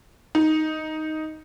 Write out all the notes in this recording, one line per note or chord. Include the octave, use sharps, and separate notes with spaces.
D#4